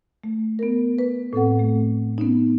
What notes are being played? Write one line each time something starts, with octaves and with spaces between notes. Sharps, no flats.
A3
B3 A#4
B4
A2 C4 A4 F#5
A3
B3 C#4 D#4